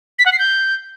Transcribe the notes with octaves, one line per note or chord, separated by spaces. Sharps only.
B6
F#5
C7
G6